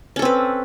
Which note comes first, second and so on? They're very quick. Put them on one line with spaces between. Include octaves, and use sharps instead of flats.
C#4 A4 C4 B4